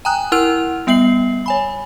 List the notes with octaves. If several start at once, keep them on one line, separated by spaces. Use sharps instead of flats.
G5 G#5 A#5 D#6 F#6
E4 A#4 F#5 E6 F6 F7
G3 B3 E5 C7 F#7
C#5 G#5 B5